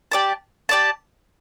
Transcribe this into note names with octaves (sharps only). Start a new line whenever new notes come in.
G4 D5 A5
G4 D5 A5